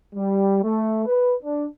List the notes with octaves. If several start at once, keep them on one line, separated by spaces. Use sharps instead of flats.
G3
A3
B4
D4